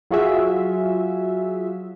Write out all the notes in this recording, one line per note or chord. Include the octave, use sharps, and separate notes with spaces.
F#3 F4 F#4 G#4 E5